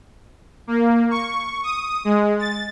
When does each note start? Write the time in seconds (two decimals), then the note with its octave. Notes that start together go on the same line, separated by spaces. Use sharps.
0.67 A#3
1.11 C#6
1.63 D#6
2.05 G#3
2.39 A6